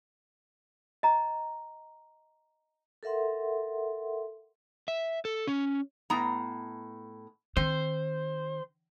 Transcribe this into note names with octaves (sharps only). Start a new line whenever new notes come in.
D#5 A#5
A4 A#4 E5 F#5 C6
E5
A4
C#4
A2 B3 A#5
D#3 C4 C5